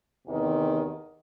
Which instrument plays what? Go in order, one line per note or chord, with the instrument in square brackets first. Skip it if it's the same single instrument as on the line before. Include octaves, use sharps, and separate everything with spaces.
[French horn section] E2 C3 D#3